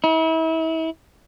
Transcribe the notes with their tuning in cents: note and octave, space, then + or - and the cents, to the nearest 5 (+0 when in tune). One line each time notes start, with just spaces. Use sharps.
E4 -35